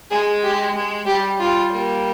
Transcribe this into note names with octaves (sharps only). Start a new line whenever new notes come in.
G#3 G#4
G4
G#3
G3 G4
G3 F4
G3 A#3